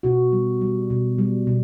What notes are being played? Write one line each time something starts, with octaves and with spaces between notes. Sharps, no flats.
B2 F#4
G3
G3
B2
G3
B2